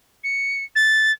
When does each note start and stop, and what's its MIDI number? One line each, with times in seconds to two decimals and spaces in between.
0.24 0.63 97
0.75 1.12 93